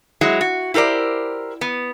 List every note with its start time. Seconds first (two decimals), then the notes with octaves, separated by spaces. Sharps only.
0.21 F#3 G#3 E4
0.41 F#4
0.74 E4 G4 A#4 C5 D5
1.61 B3